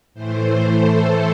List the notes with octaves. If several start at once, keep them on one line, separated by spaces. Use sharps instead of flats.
A2 E3 A3 C5
A4